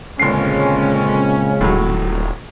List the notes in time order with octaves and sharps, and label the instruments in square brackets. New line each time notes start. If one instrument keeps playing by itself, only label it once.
[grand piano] G1 C7 [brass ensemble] A#2 C4 C#4 [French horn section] C#3 G#3
[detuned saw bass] D#1 [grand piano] A2 F#3